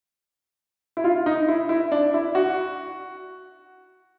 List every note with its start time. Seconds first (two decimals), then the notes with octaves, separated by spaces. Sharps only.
0.97 E4
1.04 F4
1.26 D#4
1.48 E4
1.69 E4
1.92 D4
2.14 E4
2.35 F#4